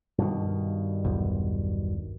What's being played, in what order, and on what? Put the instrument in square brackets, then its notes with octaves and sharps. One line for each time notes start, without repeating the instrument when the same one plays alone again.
[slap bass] G2 B2 D#3
[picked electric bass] E1 B1